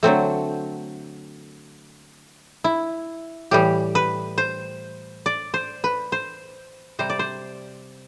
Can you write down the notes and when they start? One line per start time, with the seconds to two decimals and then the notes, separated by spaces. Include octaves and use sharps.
0.03 D3 F#3 A3 C4
2.64 E4
3.51 A2 E3 G3 G4
3.95 B4
4.38 C5
5.26 D5
5.54 C5
5.84 B4
6.12 C5
6.99 C3 G3 C5
7.10 D5
7.19 C5